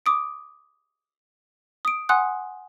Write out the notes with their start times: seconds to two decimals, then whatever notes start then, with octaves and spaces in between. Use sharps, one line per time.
0.06 D6 D#6 D7
1.85 D#6 D7
2.09 F#5 G#5 C6 D#6 F#6